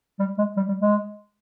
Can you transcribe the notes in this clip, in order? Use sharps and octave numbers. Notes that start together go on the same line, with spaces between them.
G3
G#3
G3
G3
G#3